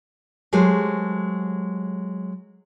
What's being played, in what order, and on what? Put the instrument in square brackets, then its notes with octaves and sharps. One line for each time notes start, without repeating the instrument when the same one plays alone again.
[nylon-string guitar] F#3 G#3 A3 G4 C5